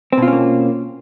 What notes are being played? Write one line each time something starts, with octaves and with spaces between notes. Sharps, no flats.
B2 A#3 C4 C#4 F4